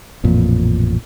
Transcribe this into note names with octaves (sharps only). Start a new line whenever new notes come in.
A1 F2 A#2